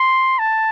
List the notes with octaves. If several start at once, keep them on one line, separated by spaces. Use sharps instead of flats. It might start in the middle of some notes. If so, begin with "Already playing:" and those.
Already playing: C6
A5